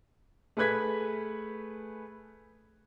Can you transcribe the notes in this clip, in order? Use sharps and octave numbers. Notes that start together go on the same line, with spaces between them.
A3 G#4 B4 F#6 G#6 B6